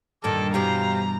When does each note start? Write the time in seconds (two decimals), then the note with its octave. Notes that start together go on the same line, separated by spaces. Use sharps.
0.24 D2 G2 A#2 D#3 A4 A#4 D6
0.54 G2 B2 E3 G4 C5 F5 A#5